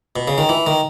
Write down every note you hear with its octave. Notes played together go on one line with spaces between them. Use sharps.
B2
C#3
D#3
E3
D#3